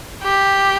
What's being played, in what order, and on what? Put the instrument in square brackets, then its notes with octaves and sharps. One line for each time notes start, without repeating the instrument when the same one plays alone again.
[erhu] G4